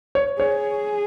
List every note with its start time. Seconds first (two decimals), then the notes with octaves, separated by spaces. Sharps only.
0.15 C#5
0.39 G#4 C#5